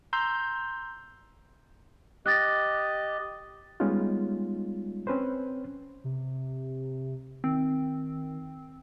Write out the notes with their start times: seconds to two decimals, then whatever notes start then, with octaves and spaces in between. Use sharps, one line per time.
0.13 A#5 C6 E6 G6
2.26 G4 D#5 F#6 A6 A#6
3.80 G3 G#3 B3 C#4 D#4 F4
5.07 C4 C#4 B4 C5
6.04 C3
7.44 D#3 C4